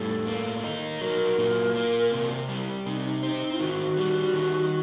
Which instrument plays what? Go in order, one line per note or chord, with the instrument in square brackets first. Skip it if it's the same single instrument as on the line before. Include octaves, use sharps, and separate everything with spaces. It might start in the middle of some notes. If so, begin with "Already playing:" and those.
Already playing: [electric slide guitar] A2 G3 [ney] A4
[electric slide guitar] A#3
D#4
[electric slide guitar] F#3 [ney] A#4
[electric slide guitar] A#2
A#3
C3
G3
[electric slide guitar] C3 [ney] D#4
[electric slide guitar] C4 [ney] D#4
[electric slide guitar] D#3 [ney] F#4
[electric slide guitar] G3
D#3